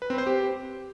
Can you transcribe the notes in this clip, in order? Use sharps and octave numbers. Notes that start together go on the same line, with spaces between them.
B4
C4
C5
G4